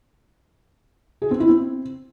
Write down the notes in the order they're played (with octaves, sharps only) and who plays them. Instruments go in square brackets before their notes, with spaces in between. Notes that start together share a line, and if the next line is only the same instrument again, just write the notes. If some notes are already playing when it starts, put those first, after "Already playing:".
[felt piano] G#4
C4
E4
C4